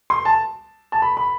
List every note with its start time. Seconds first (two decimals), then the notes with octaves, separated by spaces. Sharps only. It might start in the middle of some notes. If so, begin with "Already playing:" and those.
0.10 C6
0.25 A5
0.92 A5
1.02 B5
1.17 B5